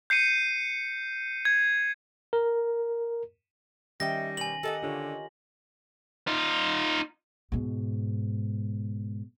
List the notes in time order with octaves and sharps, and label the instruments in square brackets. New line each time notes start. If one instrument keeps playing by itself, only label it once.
[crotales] G6 C7 C#7 D#7
G#6
[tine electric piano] A#4
[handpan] D#3 C#4 [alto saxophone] G3 [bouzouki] D#4 E5 G5 [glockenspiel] A#6
[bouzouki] B2 [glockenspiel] G#5 F#7
[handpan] G4 [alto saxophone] A4 [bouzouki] A#4 D#5 F#5
[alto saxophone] D3 [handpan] F4 G4 C#5
[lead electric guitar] D#4 F4
[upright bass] G#2 B2